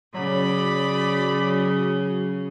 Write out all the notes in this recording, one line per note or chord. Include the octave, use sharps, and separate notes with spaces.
C#3 F#3 D5 B5